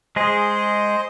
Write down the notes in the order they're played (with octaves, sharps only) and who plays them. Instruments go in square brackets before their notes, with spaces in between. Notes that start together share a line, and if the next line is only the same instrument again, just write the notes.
[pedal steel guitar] G#3 G#4 [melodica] C5 D#5